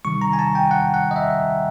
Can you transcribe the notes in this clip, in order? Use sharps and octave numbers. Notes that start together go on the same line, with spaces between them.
C3 D#3 G3 C#6
A#5
G#5
A5
G5
F#5
F#5
D#5
E5